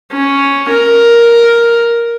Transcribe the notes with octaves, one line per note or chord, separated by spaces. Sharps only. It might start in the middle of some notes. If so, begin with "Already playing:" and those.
C#4
A#4